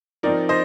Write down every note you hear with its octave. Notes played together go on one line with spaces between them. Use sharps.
F3 C4 D#4 A#4 D5
C5 D#5